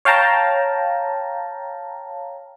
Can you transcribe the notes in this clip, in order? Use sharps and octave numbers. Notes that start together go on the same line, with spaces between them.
C#5 F5 G5 A5 A#5